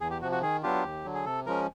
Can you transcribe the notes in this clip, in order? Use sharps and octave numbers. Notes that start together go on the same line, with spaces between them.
E2 G#4
G4
C3 F3 F#4
F#4
D#3 G#4
F#3 B3 D4 F4 G4
D#2
D3 F#3
G#4
C3 A4
F3 G#3 C#4 A#4